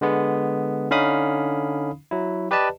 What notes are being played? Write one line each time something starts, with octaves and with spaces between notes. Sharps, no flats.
D3 G#3 B3
D3 C#4 D#4 F5 B5 D#6
F#3 E4
G4 B4 D5 D#5 A5